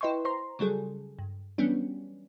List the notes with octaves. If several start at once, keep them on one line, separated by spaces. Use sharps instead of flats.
E4 B4 D#5 G5 C6 C#6
C5 A#5 C6
C#3 F#3 G3 G#4 A4
G2
E3 F#3 G3 B3 C#4 D4